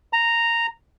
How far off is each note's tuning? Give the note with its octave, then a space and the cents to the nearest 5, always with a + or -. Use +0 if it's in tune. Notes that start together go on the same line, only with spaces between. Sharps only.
A#5 -5